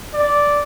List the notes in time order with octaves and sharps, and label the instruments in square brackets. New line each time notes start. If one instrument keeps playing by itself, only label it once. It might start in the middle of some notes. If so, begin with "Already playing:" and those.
[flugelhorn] D5